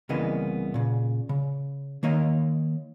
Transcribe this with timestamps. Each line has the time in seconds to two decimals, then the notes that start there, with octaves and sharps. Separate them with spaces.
0.09 C2 C#3 E3 A#3 B3 D#5
0.74 A#2 C#3
1.29 C#3
2.03 D#3 A#3 C#5 D#5